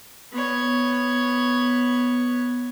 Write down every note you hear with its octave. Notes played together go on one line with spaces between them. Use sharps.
B3 C#5